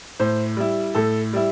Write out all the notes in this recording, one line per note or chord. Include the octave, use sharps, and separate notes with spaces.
A2 C5
G3 E4
A2 A4
G3 E4